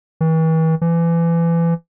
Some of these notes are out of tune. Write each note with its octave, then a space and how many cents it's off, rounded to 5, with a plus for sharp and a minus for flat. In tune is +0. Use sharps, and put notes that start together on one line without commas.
E3 -40
E3 +30